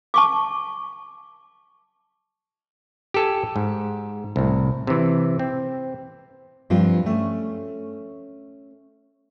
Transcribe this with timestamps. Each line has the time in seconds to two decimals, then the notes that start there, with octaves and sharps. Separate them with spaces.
0.14 A5 C#6 D6
3.14 G4 A4 G#5
3.56 G#2
4.36 C2 A2
4.87 C3 E3
5.39 C4
6.70 G2 F3 G3 C4 F4
7.06 A3 C#4